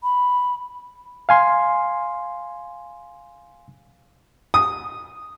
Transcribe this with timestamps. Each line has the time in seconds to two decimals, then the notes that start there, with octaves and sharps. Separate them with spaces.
0.03 B5
1.29 F5 G#5 C6
4.54 D#6